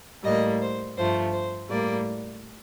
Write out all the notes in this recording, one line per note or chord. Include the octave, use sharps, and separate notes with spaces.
A2 G3 A#3 D#5
C5
G2 F3 A3 C5
C5
A2 G3 A#3 D5